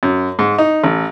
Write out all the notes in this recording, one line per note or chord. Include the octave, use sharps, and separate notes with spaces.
F#2
G#2
D#4
A1